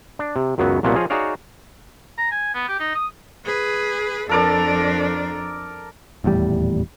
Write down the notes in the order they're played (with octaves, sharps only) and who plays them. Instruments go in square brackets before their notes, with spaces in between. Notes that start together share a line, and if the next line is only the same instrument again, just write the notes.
[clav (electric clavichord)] D4
C3
C#2 F#2 D#3 F#3 B3
C2 A#2 F3 F#3 B3
F3 F4 G#4 C#5 D#5
D#4 F#4 G#4 C#5 D5 F5
[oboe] A#5
G#5
B3
G4
D#4
D#6
[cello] G#4 B4
[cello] F2 D4 [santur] A4 A#4 D5
[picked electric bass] D#1 E2 A2 G3